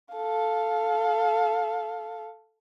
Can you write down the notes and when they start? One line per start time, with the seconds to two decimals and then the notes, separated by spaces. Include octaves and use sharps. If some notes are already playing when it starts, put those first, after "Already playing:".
0.15 A4 F5